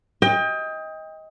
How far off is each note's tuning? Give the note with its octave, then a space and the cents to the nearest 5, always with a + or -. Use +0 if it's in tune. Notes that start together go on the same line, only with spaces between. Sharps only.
D#5 +20 G5 +30